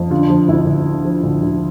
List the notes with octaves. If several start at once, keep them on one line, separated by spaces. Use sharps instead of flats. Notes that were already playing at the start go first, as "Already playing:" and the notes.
Already playing: F2
D3 F4
F3
D2 E4
D2
D3
F3
D2
D2